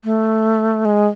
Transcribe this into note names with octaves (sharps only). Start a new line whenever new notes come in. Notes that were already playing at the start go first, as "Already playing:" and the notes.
A3
G#3